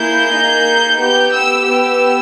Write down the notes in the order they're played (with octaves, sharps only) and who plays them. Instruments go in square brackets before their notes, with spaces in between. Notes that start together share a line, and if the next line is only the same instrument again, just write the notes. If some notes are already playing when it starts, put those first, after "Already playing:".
Already playing: [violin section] A#3 E4 G#4 G6
A#3 D#4 G#4
B3 G4 G6
E6
B3 G4 E6